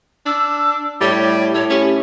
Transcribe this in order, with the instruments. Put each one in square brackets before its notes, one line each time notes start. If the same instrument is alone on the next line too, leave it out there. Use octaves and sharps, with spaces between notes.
[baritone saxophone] D4 [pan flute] E6
[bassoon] A2 [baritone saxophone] G3 [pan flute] C#5
[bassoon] A2 [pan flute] C#5
[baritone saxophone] C#4 [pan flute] G4